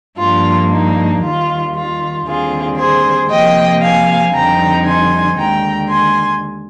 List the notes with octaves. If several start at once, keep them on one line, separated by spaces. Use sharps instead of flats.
G2 F3 A#3 D4 F4
D#4
D#2 D#3 G3 F4
F4
D#2 D3 G3 C4 F4 G#4
G#4 C5
C3 F3 A#3 D#5 G5
F5 G#5
F2 D3 G3 C4 D#4 G5 A#5
G#5 C6
D#2 D3 G#3 G5 A#5
G#5 C6